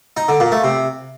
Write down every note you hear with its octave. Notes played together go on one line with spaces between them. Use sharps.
D#4
D3
A#2
A3
C3